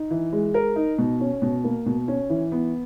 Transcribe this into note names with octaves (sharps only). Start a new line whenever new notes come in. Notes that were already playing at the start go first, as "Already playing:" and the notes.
Already playing: D#4
E3
G#3
A#4
D#4
B2
C#4
B2
A#3
B2
C#4
E3
B3